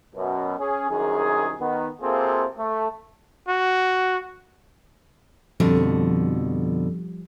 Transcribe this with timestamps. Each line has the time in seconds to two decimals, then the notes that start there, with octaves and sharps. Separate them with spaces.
0.16 F#2 B2
0.59 C#4 G#4
0.91 C2 F#2 D#3 G#4
1.61 D#3 B3
2.02 C3 A#3 C4 F4 G#4 A4
2.58 A3
3.48 F#4
5.60 F2 B2 D3 F3 G3